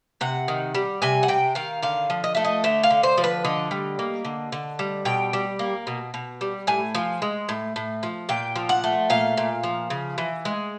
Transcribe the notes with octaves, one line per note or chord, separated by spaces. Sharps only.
C3 F#5
D#3
G3
C3 G#5
F#5
C3 G5
D#3 F5
D3 F5
F3
D#5
A3 E5
D#5
D3 E5
F5
D3
C5
F3
B4
D3 D#5
G3
A#3
D3
D3
G3
B2 G5
G3
A#3
B2
B2
G3
A2 G#5
F3
G#3
A2
A2
F3
A#2 G5
F3
F#5
A3
A#2 F5
A#2
F3
C#3
E3
G#3